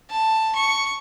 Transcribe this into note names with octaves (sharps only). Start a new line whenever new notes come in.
A5
C#6